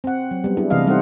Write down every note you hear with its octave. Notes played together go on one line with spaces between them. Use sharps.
C4 F#5
F#3
G3 B3
D4 E4 G#4
C3 E3 A3 D#5 F5
G3 D#4 E4 A4 C5 F#5